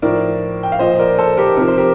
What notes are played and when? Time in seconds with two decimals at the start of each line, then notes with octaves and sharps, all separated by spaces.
0.02 A2 F3 A#4 D5
0.63 G5
0.72 F5
0.79 A#2 F3 C5 D#5
0.99 A#4 D5
1.19 A4 C5
1.37 G4 A#4
1.57 C3 F3 A#4
1.68 C5
1.77 G4 A#4